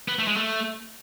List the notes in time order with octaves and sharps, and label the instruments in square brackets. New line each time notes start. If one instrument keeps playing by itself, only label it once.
[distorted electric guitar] B3
A3
G#3
A3